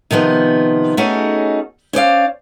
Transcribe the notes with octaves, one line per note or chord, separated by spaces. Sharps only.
C3 D#3 F3 B3
A3 C#4 D#4 F#4 G#4
C#4 C5 D5 F5